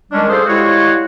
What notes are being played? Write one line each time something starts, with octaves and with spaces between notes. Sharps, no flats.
D#3 G3 G#3 C#4 D4
F4 G#4 A4 C5
G3 G#3 E4 F#4 C#5 F5